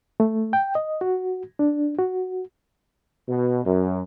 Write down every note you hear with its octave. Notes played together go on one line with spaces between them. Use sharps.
A3
G5
D#5
F#4
D4
F#4
B2
F#2